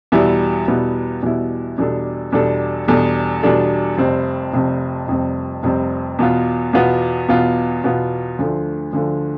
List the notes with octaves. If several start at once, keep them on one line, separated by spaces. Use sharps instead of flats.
E2 B2 G3 B3 E4
E2 B2 G3 B3 E4
E2 B2 G3 B3 E4
E2 B2 G3 D4 A4
E2 B2 G3 D4 A4
E2 B2 G3 D4 A4
E2 B2 G3 D4 A4
F1 F2 C3 G3 C4
F1 F2 C3 G3 C4
F1 F2 C3 G3 C4
F1 F2 C3 G3 C4
E2 B2 B3 F4
E2 B2 B3 F4
E2 B2 B3 F4
E2 B2 B3 F4
D2 D3 F3 A3
D2 D3 F3 A3